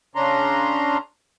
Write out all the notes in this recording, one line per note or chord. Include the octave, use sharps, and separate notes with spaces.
C#3 C#4 D4 A#5 C6